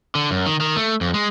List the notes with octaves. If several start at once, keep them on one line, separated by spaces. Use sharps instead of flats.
D3
F#2
D#3
D#3
A3
F2
G#3